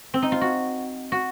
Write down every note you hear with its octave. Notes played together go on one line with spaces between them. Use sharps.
C4
D#4
F4
F#4
F#4